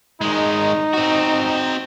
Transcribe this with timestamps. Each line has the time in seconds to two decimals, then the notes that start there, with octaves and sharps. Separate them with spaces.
0.21 D#3 G#3 D#4
0.93 C4 F#4